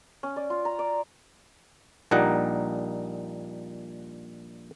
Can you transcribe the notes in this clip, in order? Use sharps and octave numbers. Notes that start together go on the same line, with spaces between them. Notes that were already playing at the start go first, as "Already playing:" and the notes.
C#4
D5
F4
A#5
D5
A#1 A#2 G3 D#4 F#5 A#5